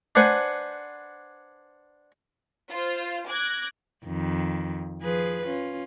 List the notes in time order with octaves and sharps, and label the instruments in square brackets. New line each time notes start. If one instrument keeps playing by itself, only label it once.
[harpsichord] D4 B4 C5 F#5 G#5
[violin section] F4 C5
D6 F#6 G#6 A#6
[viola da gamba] F2 D#3
F3 G#4 B4
C#4 F4